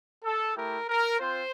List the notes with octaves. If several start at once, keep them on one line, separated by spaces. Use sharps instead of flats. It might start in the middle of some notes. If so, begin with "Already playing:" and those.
A4
A3 E4 G4 A#4
A#4
C4 F4 C5